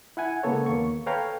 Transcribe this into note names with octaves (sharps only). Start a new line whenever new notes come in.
E4 F#5 G#5
C#3 G#3 A#3 B3 A4 C#5
D#2 A#3 C#6
A4 B4 C#5 F5 G5 A#5